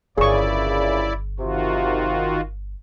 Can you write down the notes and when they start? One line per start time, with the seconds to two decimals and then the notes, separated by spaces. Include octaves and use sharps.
0.18 G1 G2 A#2 C#3 E4 G#4 D5 C#6
1.40 C3 D#3 F4 F#4